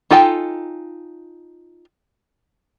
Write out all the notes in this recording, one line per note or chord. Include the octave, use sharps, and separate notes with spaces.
D#4 F4 A4 G5 G#5